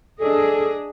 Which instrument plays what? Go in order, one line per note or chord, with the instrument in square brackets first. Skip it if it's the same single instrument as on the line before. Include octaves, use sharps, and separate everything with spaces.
[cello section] D4 G#4 D#5 [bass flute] A4